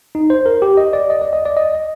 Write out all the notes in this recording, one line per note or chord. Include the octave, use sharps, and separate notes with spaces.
D#4
C5
A#4
G4
D#5
D5
D#5
D5
D#5
D5
D#5